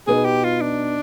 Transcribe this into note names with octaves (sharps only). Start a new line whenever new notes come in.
B2 B3 D#4 G#4
G4
F4
D4